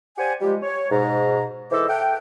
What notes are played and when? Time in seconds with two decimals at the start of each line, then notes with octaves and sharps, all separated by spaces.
0.18 G4 C5 D5 F#5 G#5
0.41 F3 G3 G#3 G4
0.63 C#5
0.91 G#2 B2 A#5
1.71 G#2 E3 A4 C5 D#5 D6
1.88 A4 E5 F#5 G5